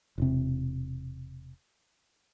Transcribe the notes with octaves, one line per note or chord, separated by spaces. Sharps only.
E1 C3